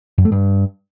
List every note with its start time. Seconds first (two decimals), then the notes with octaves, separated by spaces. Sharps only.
0.18 F#2
0.25 A3
0.32 G2